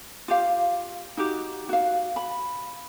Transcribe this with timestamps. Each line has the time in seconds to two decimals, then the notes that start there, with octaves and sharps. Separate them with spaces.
0.28 F4 G4 F5
1.17 D#4 F#4 G4
1.69 F#4 F5
2.16 B5